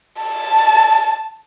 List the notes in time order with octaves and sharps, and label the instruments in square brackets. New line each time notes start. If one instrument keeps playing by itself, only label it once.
[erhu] A5